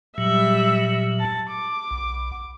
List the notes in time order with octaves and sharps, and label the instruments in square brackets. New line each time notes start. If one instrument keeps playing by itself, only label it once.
[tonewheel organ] A#2 F#3 [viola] G3 E5
[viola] A5
D6
[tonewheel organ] B1